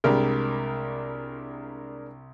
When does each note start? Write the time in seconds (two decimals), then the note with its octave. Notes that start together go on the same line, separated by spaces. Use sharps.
0.04 C2 G3 G#3 D4 A#4